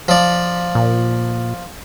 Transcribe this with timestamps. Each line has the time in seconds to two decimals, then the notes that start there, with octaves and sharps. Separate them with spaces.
0.08 F3 D5
0.75 A#2